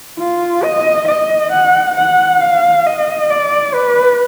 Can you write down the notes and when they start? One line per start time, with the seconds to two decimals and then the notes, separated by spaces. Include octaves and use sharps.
0.19 F4
0.64 D#5
1.08 D#5
1.52 F#5
1.97 F#5
2.41 F5
2.86 D#5
3.30 D5
3.74 B4